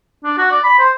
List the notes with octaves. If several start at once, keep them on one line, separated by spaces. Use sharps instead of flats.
D4
F#4
D5
B5
C5